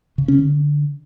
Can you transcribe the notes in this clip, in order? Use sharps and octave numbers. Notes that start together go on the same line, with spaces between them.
C#3
C#4
D3